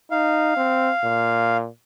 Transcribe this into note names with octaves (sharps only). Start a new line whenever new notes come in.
D#4 F5
C4
A#2